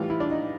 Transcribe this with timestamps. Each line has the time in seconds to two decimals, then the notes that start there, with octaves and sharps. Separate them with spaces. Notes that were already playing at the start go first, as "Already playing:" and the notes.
Already playing: A2 E3 G3 F4
0.10 E4
0.20 D4
0.31 D#4